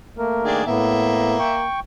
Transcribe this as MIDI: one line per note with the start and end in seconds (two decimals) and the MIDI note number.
0.18 0.62 57
0.18 0.62 58
0.18 0.62 70
0.44 0.63 51
0.44 0.63 62
0.44 0.63 68
0.66 1.38 45
0.66 1.64 58
0.66 1.38 59
0.66 1.64 76
1.39 1.80 79
1.39 1.80 85